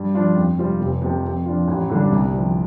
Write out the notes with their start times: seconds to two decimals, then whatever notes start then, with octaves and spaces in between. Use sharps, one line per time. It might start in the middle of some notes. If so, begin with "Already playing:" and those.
Already playing: G2
0.15 F3 D4 F4
0.36 F2
0.58 C3 G3 C4 F4
0.80 F1
1.02 F2 C3 F3
1.24 F2
1.46 F3 D4 F4
1.68 A1
1.90 G2 D3 G3 D4
2.11 C2
2.33 C3 F3